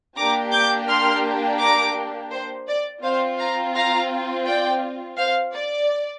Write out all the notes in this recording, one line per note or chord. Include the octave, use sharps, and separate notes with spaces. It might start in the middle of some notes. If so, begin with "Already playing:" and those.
A#3 D4 G4 A#5 D6
D6 G6
C6 F6
A#5 D6
C5
D5
C4 F4 C5 F5
F5 A#5
F5 A#5
D5 G5
C5 F5
D5